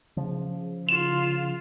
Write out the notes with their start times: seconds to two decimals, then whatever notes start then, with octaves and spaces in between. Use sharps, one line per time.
0.17 C#3 F3
0.89 F4 E7